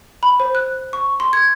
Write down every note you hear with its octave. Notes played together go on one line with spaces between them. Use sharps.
B5
C5
F#6
C#6
C6
G#6